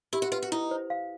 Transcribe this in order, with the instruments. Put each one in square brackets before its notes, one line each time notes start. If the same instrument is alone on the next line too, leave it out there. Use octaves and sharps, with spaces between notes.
[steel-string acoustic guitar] E4 [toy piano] G4
[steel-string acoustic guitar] F#4
[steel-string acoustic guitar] F4 [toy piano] B4
[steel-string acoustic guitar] F#4
[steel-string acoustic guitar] D#4 [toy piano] E4
[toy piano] C5
F5